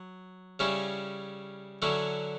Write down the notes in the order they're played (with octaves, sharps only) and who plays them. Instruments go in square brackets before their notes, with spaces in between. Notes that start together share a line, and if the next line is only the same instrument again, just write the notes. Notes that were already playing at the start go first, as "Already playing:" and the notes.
Already playing: [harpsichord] F#3
C#3 G3 C#4 E4
D3 F#3 C#4 E4